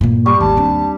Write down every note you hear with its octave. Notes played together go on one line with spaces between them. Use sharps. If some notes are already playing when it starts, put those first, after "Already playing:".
G2 A#2 A#3
G3 C#6
G#1 D#2 D#3 A#3 A5
C4 D4